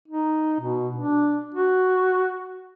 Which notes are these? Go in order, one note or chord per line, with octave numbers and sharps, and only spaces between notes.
D#4
B2
D4
F#4